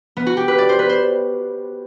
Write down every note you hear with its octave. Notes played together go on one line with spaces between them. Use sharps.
B3
F#4
G4
B4
D5
C5
B4
C5